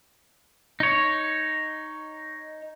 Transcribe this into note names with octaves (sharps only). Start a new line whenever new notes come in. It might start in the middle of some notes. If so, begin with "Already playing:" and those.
D#4 C#5